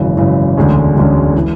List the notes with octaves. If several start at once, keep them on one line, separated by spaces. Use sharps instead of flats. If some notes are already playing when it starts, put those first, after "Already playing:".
Already playing: G#1 F#2 C#3 E3
G#1 F#2 C#3 E3
E1 D2 D3 G#3 C#4
E1 D2 D3 G#3 C#4
E3